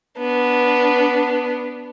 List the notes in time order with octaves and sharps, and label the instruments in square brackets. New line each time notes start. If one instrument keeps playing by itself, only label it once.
[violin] B3 D4